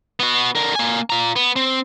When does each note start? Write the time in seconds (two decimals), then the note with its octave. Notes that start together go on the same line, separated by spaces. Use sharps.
0.20 B3 F#4
0.55 D3 A#4
0.75 A#3 G#5
1.10 F4 A#5
1.36 B3
1.56 C4